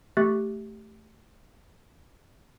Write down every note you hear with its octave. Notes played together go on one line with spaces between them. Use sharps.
A3 G4 E5 C#6 F#6 A6